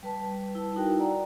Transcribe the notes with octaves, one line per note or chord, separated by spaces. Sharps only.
G3 B4 A5
E4
D#4 F#4 A#4 G5
D5 F#5 G5 A#5